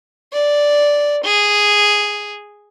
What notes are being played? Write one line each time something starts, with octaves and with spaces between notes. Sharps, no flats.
D5
G#4